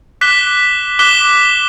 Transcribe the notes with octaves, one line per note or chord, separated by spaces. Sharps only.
D6 F#6 B6 E7 G7
D6 F#6 B6 E7 G7